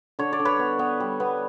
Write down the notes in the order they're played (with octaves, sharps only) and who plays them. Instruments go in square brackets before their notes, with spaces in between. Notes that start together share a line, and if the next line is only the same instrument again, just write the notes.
[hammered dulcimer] D3 C#5
D5
D3
B4 C#5
B3
B3
G3
B3